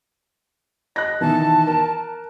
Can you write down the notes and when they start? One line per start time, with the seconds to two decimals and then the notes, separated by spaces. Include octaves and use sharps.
0.96 D#5 F#6 A#6
1.21 B2 D#3 E3 A5
1.67 A#4